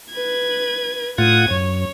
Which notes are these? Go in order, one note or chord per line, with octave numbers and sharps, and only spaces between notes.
B4 G#6
A2 F4 F#5 D#6 G#6
F#2 C#5